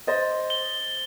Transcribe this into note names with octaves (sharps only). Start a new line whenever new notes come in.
C5 D#5 A6
G7